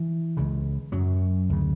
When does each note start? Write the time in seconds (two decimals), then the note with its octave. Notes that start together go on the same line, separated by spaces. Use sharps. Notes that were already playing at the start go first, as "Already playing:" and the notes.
Already playing: E3
0.37 C#2 C#3
0.92 F#2 F#3
1.49 D2 C#3